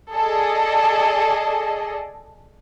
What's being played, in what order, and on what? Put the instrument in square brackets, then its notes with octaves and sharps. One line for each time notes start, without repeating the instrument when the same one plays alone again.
[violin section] G#4 A4 D5 D#5